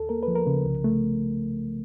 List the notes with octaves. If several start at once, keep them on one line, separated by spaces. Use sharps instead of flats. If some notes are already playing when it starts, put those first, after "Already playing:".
Already playing: D#2 A4
A#3 A#4
F3 B4
A#4
C#3
C2
A3